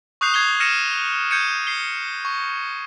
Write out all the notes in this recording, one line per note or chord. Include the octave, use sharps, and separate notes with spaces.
C#6 D#6 F#6 G6 C7 F7
G#6 C7 F7 G7
F6 A#6 C#7 D#7 E7
G6 G#6 C#7 D#7
C7 G7
C#6